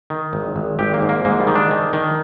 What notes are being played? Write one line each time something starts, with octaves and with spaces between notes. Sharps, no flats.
D#3
G#1
G#1
G#1 G4
A#3
G#2
A#3
G#2 A#3
G3
D#3
D4
D#3
D#3